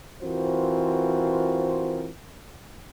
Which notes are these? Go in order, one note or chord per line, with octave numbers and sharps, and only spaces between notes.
E3 C4 F4 F#4 A#4 C5